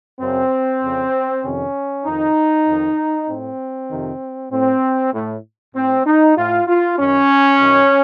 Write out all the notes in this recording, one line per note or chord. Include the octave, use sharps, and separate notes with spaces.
F#2 C#3 C4
F2 C#3
F2 C3 D#3 C#4
F2 D#3 D#4
F2 D#3
A2 C4
F2 C3 D#3
A2 C4
A2
A2 C4
D#4
A2 F4
F4
F#2 D#3 C#4
F#2 D#3